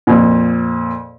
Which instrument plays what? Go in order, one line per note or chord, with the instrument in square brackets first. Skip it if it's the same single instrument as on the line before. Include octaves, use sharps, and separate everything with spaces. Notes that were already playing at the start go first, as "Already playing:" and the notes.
[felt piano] F2 A#2